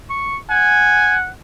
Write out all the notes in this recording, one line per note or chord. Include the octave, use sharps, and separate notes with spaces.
C#6
F#5 G#5